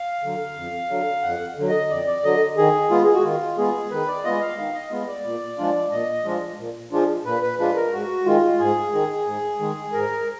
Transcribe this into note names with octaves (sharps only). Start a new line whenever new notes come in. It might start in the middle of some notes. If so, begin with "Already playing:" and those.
Already playing: F5
D3 F#3
F2
D3 F#3
F2 F#5
D3 F#3
D#5
F2 D5
D5
D3 F#3 D#5
D#3 G#4
G#3 B3 F4
G#4
F#4
D#3 F4
G#3 B3 F4 G#4
D#3 B4
D5
G#3 B3 F4 D#5
F5
D#3 F5
D#5
G#3 B3 F4
D5
A#2
F3 G#3 D4 F4
A#2 D#5
F3 G#3 D4 F4
A#2
F3 G#3 D4 F4
A#2 B4
B4
F3 G#3 D4 F4 B4
A#4
G#2 F#4
D#3 G#3 F4
G#2 G#4
D#3 G#3
G#2
D#3 G#3
G#2 A#4